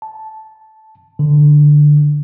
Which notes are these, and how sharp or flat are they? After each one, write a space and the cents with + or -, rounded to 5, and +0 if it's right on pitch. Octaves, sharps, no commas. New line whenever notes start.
A5 -10
D3 +5